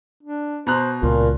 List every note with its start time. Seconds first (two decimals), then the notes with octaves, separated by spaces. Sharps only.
0.23 D4
0.67 B2 C5 A#5 F#6
1.03 C#2 A#2 F4